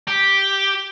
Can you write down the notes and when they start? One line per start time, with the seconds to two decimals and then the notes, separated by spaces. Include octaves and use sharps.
0.08 G4